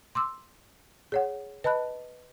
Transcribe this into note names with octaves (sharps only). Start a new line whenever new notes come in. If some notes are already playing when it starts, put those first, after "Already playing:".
C6 D6 E6
G#4 C#5 F#5
B4 D#5 A5 B5 F#6